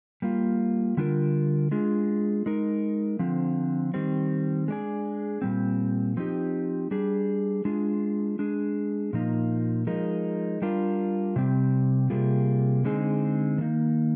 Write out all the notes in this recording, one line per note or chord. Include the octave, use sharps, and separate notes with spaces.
G3 A#3 F4
D3 G3 D4 F4 A#4
G#3 D4 F4 G#4
G#3 D#4 A#4
D3 F3 C4
D#3 G3 C4
G#3 D4 G#4
A#2 G3 C4
F3 C4 D#4 G4
G3 D4 G#4
G#3 D4 F4 G#4
G#3 D4 G#4
A#2 F3 A#3 D#4
F3 G#3 D#4 A#4
G3 D4 F4 A#4
C3 G3 C4
C3 G3 A#3 F4 G#4
D3 G#3 C4 D#4 G#4
D#3 A#3 D#4